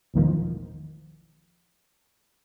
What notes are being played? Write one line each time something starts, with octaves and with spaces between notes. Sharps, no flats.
A1 E2 B2 D#3 F3